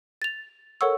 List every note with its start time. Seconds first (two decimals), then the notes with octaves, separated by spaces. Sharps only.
0.22 A6 F7
0.81 A4 A#4 C#5 F#5 C#6 E6